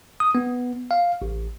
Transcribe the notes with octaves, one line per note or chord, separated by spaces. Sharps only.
D#6
B3
F5
A1